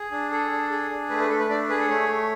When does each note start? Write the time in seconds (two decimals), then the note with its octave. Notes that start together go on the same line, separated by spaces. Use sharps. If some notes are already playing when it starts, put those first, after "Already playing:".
Already playing: G#4
0.11 D4
0.31 G#4 A4
0.50 D4
0.71 G#4
0.91 D4
1.10 A3 B4
1.20 B4
1.29 A3 A4
1.39 B4
1.49 D4 D5
1.69 G#4 B4
1.79 A4
1.89 A3 C#5
2.09 A3